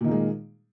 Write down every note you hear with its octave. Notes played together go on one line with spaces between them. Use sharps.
A#2 D#3 G#3 A#3